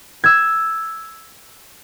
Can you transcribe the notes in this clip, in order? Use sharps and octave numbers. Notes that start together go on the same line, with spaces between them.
E6 G#6